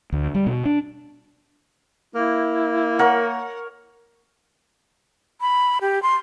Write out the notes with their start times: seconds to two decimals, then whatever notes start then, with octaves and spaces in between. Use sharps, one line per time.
0.12 D2
0.35 G3
0.46 B2
0.65 D4
2.15 A#3 E4
2.99 A#4 C#5 F#5
5.41 B5
5.81 G4
6.03 C6